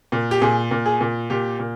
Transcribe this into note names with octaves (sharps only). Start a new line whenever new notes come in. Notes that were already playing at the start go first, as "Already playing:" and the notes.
A#2
G4
A#2 G#4
A#2
G#4
A#2
A#2 G4
A#2